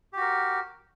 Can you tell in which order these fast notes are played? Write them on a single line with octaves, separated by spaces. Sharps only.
G4 F#4 A#4